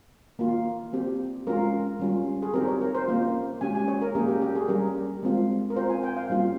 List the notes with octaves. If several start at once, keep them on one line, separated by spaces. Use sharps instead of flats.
A#3 F4
C4 G4
G#3 C#4 F4 A#4
G3 C#4 F4
G#4
C4 D#4 G4 A#4
C#5
A#4
C5
A#3 C#4 F4
G#3 C#4 G4 G#5
G#5
C#5
A#4
A#3 C#4 G4 G#4
G4
G4
G#4
G3 C#4 G4 A#4
G#3 C4 F4
A#4
C4 F4 C5
G#5
G5
F5
G3 A#3 C#4 F4